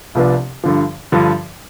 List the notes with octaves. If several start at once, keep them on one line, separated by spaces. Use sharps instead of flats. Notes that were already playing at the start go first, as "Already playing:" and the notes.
C2 C3 F3 B3 D4
G2 D3 F3
G2 D3 F3